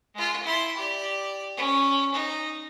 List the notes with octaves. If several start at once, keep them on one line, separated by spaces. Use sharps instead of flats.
G#3 F4
E4 C6
G4 D5
C#4
D#4